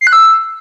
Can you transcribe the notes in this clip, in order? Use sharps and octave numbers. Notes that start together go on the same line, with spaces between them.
C7
F#6
E6